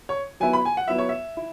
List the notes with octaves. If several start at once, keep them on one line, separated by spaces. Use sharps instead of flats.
C#5
F#3 B3 E4 G#5
B5
G#5
F#5
F#3 B3 E4 E5
C#5
E5
E4